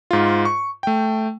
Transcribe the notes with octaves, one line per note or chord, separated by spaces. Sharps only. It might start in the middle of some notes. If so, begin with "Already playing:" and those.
G#2 F4
C#6
A3 G5